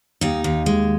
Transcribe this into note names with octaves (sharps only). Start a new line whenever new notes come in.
D#2 D#4
D#2
G#3